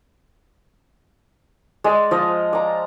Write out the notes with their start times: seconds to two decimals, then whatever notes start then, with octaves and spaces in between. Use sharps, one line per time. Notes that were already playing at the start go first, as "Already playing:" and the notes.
1.84 G#3 D5
2.11 F3 D#5
2.53 D5 A#5